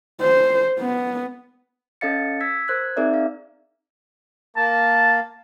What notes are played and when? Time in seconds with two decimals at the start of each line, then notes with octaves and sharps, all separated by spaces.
0.22 C5
0.80 B3
2.01 C#4 A4 D#5 F5 A6 C#7
2.41 E6 G#6 B6
2.68 A#4 C5 F#6 G#6
2.96 C4 D#4 G#4 A#4 D5 E5
3.14 F5
4.57 A#3 A5